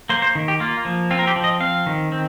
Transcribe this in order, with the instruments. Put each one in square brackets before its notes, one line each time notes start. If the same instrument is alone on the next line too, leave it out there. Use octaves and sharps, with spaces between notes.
[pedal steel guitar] A#3 C5
C5
D#3
G4
A#3 F4
F3
C4 F4
A#4
G4
F3
D#5
C4 F5
D#3
C4